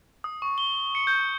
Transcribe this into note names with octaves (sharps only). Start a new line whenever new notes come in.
D#6
C#6
G7
C#7
G6